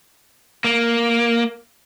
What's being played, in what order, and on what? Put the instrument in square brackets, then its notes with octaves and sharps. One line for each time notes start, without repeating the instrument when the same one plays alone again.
[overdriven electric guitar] A#3